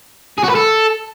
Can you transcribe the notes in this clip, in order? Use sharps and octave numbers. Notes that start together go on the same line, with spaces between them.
G#4
F#4
B4
A4